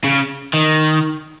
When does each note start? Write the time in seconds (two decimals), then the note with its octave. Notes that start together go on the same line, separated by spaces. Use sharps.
0.04 C#3
0.54 D#3